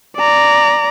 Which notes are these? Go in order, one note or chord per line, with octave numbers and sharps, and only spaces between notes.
D5 A#5